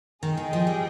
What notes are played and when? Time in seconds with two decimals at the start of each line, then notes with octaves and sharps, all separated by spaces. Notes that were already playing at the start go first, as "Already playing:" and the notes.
0.22 D#3 G#4 D#5 G5
0.37 D#3
0.53 F3
0.67 G3